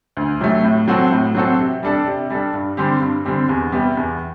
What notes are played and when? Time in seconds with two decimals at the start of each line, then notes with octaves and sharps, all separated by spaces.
0.17 D2
0.40 C3 F#3 A3
0.64 A2
0.88 F#3 C4 F#4 A4
1.12 A2
1.35 F#3 C4 F#4 A4
1.59 C3
1.83 G3 D4 A4
2.06 C3
2.30 G3 D4 A4
2.54 G2
2.77 D3 G3 C4 G4
3.01 G2
3.25 D3 G3 C4 G4
3.49 E2
3.72 C3 G3 B3
3.97 E2